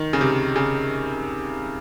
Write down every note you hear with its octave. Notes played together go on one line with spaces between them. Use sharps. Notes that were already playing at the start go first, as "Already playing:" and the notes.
Already playing: D#3
C#3
C3
C#3